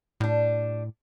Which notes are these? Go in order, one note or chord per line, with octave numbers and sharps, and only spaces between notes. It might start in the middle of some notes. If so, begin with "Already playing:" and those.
A2 G3 D4